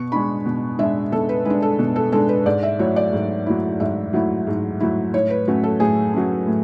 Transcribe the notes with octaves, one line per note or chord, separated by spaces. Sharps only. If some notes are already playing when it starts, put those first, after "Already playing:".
Already playing: B2 C#6
G#3 D4 B5
B2
G#3 D4 E5
B2 A4
B4
G#3 D4 B4
A4
B2
A4
G#3 D4 A4
B4
G#2 D5
E5
F#3 A3 E4 C#5
D5
G#2
F#3 A3 E4
G#2 E5
F#3 A3 E4
G#2
F#3 A3 E4
A2 C#5
B4
F#3 A3 C#4
A4
A2 G#4
F#3 A3 C#4
A2